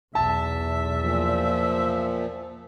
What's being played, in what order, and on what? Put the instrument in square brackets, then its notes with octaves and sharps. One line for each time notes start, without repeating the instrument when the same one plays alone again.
[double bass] B1 E2 [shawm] E5 [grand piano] A5
[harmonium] A#2 F3